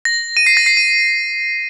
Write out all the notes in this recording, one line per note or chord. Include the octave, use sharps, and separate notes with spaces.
A#6
D#7
C7
A#6
C7
D#7